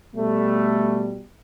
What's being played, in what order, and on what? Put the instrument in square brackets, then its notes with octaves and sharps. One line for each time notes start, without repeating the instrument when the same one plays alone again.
[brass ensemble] B2 G3 A3